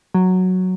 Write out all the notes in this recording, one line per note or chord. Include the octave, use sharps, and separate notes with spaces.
F#3